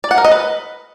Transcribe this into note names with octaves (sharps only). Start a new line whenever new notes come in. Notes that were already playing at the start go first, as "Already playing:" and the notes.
D5
F#5
A#4
D#5
B4